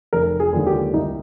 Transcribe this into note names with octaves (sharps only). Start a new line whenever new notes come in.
F1 A#4
G#4
D#2 D3 F3 G#3
G4
C2 D#4